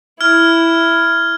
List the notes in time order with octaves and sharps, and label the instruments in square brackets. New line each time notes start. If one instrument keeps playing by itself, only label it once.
[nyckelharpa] E4 [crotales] F6 G#6